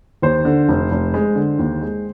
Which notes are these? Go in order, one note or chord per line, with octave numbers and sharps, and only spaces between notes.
D#2 C5
D3
F1
F1
G#3
D3
D#2
G#3